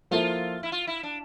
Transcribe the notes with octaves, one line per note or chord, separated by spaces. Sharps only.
F3 A#3 E4 F4 A4
E4
F4
E4
D4